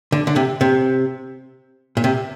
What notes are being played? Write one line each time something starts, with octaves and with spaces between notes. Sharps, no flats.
D3
D3
C3
C3
A#2
C3